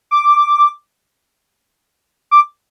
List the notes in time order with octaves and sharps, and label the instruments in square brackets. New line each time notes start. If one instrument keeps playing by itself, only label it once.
[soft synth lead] D6
D6